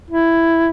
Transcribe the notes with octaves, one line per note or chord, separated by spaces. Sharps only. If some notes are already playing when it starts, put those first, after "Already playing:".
E4